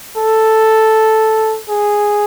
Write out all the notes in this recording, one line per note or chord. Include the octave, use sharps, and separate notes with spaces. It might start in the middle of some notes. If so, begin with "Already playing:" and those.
A4
G#4